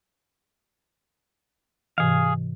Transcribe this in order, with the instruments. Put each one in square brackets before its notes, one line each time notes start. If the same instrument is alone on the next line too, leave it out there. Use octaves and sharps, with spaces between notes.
[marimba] G#2 C3 E3 [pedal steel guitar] G#4 F5